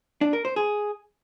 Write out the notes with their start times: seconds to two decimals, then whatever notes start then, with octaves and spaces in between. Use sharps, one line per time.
0.21 D4
0.33 A#4
0.45 C5
0.56 G#4